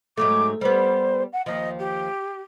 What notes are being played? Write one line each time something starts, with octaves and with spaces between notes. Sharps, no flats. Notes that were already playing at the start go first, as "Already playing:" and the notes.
G#2 F#3 A3 D6
G3 B3 C5
F#5
D#2 F3 D#5
G4